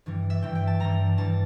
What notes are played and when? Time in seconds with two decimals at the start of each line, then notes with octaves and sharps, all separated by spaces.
0.06 G2 E3 G3
0.30 E5
0.42 G2 E3 G3 G5
0.55 G5
0.67 A5
0.80 G2 E3 G3 A#5
1.18 G2 E3 G3 A5